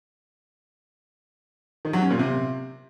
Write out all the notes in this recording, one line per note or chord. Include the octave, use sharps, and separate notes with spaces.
D#3
F#3
C#4
A#2
C3